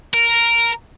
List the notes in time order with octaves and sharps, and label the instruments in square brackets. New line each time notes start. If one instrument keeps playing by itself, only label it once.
[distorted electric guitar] A#4